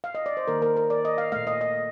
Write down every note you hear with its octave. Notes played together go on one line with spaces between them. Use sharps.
F5
D#5
D5
C5
D#3 A#3 A#4
A#4
A#4
D5
D#5
F5
A#2 A3 F5
D#5
D#5